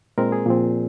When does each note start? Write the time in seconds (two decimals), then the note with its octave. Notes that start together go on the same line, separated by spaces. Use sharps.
0.18 A#2 G#3 C4 A#4
0.32 G#4
0.46 A#2 F3 C4